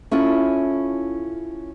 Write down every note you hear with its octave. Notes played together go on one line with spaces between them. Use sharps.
C#4 E4 F4 A4